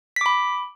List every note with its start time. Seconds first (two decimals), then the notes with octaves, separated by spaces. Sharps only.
0.16 B6
0.21 D6
0.26 B5